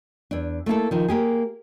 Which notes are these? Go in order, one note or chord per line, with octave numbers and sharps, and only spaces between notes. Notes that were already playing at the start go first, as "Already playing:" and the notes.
E2 D4
A3 A#3 E4 A4
D#3 F3
A#3 G4 G#4